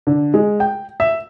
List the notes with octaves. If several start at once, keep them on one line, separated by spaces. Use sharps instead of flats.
D3
G#3
G5
E5